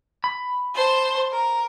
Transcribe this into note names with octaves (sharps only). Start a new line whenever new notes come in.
B5
C5 A5
A#4